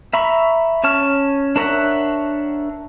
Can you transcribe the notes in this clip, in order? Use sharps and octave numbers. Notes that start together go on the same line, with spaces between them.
E5 A#5 B5 C#6
C#4 C#5 A5 C#6 F6
D4 A#4 C#5 E5 F#5